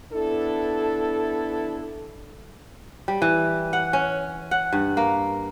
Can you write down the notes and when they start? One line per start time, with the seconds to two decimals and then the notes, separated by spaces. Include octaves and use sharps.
0.13 B3 D4 E4 A4
3.08 G3
3.22 E3
3.73 F#5
3.93 C#4
4.51 F#5
4.73 G2
4.97 A#3